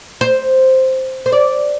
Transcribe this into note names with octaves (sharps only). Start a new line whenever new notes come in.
C5
C5
D5